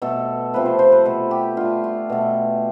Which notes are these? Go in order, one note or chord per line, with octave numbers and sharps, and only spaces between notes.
B2 A3 A4
C3 F3 A3 B4
C5
C5
B4
B2 A3 A4
G4
D3 A3 F4
F4
B2 A3